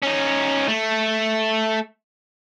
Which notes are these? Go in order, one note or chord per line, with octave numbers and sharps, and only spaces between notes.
C#4 D#4
A3